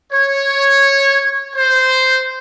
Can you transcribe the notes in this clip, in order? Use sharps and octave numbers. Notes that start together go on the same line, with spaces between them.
C#5
C5